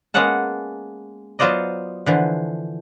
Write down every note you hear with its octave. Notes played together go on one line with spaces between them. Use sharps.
G#3 A#3 B3 C#4 F#5 A5
F#3 B3 F4 C5 D5 D#5
D3 E3 F3